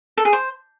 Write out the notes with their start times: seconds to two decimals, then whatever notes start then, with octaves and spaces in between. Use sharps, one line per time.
0.17 A4
0.25 G#4
0.33 C5